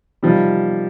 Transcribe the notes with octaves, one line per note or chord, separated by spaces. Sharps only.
C3 D#3 F3 G3